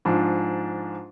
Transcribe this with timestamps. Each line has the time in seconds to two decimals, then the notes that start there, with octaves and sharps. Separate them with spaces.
0.05 G#2 F3 D4